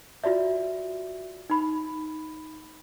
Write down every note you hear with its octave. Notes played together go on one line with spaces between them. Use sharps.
F4 F#4 D5 E5
D#4 B5